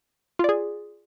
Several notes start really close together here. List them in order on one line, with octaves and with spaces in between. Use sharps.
F4 D5 G#4